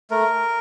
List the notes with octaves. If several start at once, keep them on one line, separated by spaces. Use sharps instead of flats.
A3 A#4